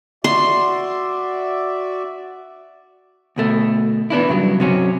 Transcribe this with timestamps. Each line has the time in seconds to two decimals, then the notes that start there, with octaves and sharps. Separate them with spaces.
0.24 F#4 D5 E5 C6
3.36 D2 B2 A3
4.10 E3 B3 D4 E4
4.29 G2 C#3 F#3
4.60 C3 F#3 C#4